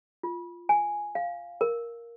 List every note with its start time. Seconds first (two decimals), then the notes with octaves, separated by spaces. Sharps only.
0.23 F4
0.69 G#5
1.15 F5
1.61 A#4